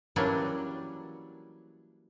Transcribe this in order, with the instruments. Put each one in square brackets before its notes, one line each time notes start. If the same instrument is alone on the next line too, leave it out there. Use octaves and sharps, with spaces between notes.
[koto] E3 F#3 G3 A#3 C#4 D4